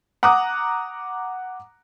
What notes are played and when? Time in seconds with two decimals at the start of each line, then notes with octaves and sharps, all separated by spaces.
0.23 F#5 A#5 D6 D#6 F#6